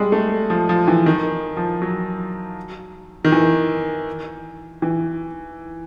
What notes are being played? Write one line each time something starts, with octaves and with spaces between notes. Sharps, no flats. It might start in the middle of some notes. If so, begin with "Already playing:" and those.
Already playing: G3 G#3
A3
F3
F3
E3
D#3
F3
F#3
D#3
E3
E3